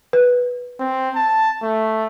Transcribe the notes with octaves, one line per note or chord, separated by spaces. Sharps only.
B4
C4
A5
A3